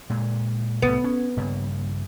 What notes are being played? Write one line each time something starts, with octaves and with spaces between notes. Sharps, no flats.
A#2 G#3
C2 A2 B3
C#4
G2 C#3 A#3